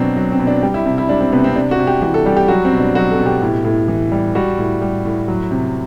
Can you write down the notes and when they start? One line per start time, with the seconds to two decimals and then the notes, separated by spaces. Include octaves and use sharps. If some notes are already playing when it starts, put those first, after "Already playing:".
Already playing: B2 F#3 C4 D4
0.16 F#3
0.32 C4
0.40 B2
0.47 D4
0.63 G3 G4
0.74 E4
0.85 C3
0.98 E4
1.09 G3 D4
1.21 C4
1.32 C3 B3
1.44 C4
1.56 C3 D4
1.71 F#4
1.79 C3
1.87 G4
2.02 E3 G4
2.14 A4
2.26 G3 G4
2.37 G4
2.48 F#3 F#4
2.65 C4
2.73 B2
2.80 D4
2.95 F#3 F#4
3.10 A4
3.19 B2
3.26 G4
3.42 A2
3.64 A2
3.88 E3
4.12 G3
4.35 G3 F#4
4.58 A2
4.82 G3
5.05 A2
5.28 F#3
5.51 C3